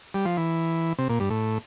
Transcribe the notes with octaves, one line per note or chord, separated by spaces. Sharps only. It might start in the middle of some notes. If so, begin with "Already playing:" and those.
G3
F3
E3
C3
A#2
G2
A2